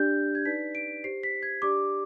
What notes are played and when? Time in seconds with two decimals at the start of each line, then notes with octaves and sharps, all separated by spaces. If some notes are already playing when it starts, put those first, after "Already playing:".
Already playing: D4 G4 D5 G6
0.35 G#6
0.45 D#4 B4 D5 B6
0.75 D7
1.04 G4 C5 C7
1.23 B6
1.43 G#6
1.62 D4 G4 D5 D6